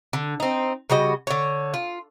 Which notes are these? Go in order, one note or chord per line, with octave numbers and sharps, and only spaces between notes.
D3
C4 D#4
C#3 G3 F#4 D#5
D3 C#5
F4